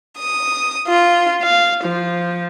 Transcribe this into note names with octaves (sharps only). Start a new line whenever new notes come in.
D#6
F4
F5
F3